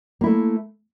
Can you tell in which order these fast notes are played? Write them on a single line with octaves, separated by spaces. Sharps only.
A#3 E4 A3